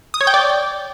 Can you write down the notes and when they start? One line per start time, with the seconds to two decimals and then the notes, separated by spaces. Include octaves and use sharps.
0.14 D#6
0.21 C#5
0.27 G5
0.34 D5